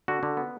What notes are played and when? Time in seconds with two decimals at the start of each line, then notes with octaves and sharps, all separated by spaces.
0.08 D3 F#4
0.23 D3
0.37 B3